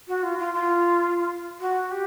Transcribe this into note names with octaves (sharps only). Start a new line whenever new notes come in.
F#4
F4
F4
F4
F#4
G4